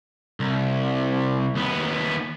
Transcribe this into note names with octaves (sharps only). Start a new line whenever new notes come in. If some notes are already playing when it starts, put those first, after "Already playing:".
C2
D#2 B3